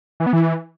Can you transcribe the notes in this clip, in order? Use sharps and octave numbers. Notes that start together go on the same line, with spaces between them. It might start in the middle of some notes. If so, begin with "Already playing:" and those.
E3
B3
E3